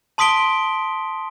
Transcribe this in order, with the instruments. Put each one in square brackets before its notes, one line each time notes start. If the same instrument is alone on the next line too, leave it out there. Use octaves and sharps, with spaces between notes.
[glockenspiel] A5 C6 D#6 B6 D7 G7